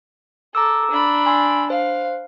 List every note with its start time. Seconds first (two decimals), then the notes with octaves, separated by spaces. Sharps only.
0.55 A4 A#5 D6 E6
0.91 D4 B5
1.26 G#5 C6 E6
1.70 C5 F5